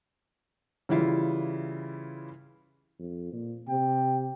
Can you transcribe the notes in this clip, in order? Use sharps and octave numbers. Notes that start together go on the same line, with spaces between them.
C#3 E3 G3 E4 F4
F2
A#2
C3 G5